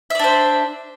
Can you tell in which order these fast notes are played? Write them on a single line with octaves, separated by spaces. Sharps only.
E5 D5 D4 C5